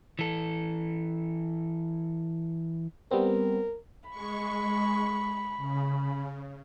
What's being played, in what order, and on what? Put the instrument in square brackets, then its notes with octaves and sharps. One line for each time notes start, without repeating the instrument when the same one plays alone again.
[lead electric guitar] E3 A4
[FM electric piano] G3 B3 C4 [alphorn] A#4
[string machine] G#3 C#6 [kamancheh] B5
[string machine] C#3